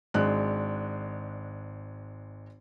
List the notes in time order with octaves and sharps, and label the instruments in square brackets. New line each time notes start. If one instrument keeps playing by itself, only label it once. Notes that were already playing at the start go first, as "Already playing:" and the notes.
[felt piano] G#1 G#3 D4 F#6